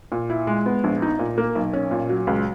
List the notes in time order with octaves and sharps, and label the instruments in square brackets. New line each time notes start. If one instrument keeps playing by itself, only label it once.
[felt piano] A#2
E4
G#3
B3
A#1
D#4
A#2
A#3
B1
C#4
A#2
F#3
C#2